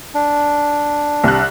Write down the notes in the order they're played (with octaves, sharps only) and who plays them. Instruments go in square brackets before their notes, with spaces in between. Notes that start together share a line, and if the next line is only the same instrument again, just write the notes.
[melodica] D4
[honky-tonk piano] C2 F#6